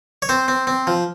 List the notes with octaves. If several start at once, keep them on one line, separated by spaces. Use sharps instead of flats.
C#5
C4 C5
C4
C4
F3